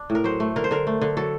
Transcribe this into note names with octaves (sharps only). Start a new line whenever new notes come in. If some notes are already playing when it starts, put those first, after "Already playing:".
Already playing: D4
A2
A#4
F#3 C5
A3
D3 A#4
C5
D3 A#4
A3
D3
F#3 A4